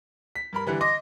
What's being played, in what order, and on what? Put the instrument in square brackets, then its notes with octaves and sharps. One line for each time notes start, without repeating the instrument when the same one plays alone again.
[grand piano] B6
G2 A#4 B5
D3 E3 G3
[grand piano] D#5 C6 D6 [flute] A#6